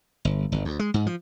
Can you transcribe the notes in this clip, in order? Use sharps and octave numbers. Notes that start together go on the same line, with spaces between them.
G1
G1
D2
G#3
G#2
F3